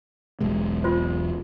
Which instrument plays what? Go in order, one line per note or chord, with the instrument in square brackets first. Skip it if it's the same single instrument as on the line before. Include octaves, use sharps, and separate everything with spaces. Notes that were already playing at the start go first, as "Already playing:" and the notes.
[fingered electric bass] E1 B1 G#3
[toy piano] F4 C5